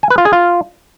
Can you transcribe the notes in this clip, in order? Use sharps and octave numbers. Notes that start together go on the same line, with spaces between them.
G#5
B4
F4
G#4
F4